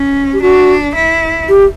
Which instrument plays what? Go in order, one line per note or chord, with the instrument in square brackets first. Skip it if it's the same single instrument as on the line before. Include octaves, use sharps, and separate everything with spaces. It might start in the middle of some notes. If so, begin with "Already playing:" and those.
Already playing: [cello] C#4
[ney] G4
[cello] D4 [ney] F#4
[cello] E4
[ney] G4